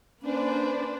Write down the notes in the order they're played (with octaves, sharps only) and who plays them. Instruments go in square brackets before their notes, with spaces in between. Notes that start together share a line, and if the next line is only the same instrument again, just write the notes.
[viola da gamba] A#3 B4 C5 [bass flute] C#4 [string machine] D4